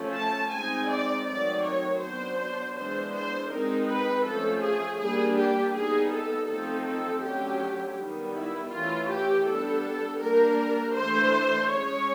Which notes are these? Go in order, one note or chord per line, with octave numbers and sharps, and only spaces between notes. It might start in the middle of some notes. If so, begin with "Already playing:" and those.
Already playing: F3 A3 C#4
A5
G#3 C4 D#4 G#5
D5
D#3 F#3 A3 C4 D#4 D5
C#5
F#3 B3 D4 C5
E3 G#3 B3 D4 C5
C5
G#3 C4 D#4 A#4
B4
F3 A3 C#4 A4
G#4
G3 A#3 D4 G#4
G4
G3 B3 D#4 G#4
A4
F3 A3 C4 D#4 A4
A4
D3 F#3 A3 C#4 G4
D#3 G3 B3 D#4
E4
E3 A3 C#4 F4
G4
G3 B3 D4 A4
G3 A#3 D4 A#4
E3 A3 D4 C5
G#3 C#4 C#5